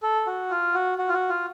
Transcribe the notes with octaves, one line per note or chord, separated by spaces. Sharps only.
A4
F#4
F4
F#4
F#4
F4
F#4
F4